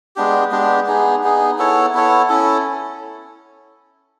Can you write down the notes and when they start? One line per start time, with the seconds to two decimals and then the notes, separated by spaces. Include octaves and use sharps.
0.16 G#3 B3 D4 G4
0.51 G#3 B3 D4 G4
0.86 B3 D#4 G#4
1.23 B3 D#4 G#4
1.58 B3 E4 A4 C#5
1.94 B3 E4 A4 C#5
2.29 C#4 E4 A4